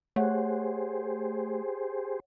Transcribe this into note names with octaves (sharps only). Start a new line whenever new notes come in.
A3 G4 G#4 C5 C#5 F#5